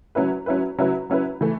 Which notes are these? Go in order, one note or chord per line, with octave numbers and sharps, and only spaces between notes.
F#3 C#4 E4 B4
F#3 C#4 E4 B4
F#3 C#4 E4 B4
F#3 C#4 E4 B4
E3 A3